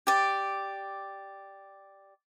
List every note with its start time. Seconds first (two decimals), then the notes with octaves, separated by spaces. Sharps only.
0.07 G4 D5